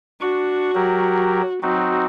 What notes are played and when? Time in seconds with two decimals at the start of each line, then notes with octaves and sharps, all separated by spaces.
0.21 D4 F#4 C#6
0.75 F#3 G4 A#4
1.63 F#3 C4 D#4 F#4